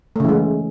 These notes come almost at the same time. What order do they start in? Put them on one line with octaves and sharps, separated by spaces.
A3 C#3 E3 G#3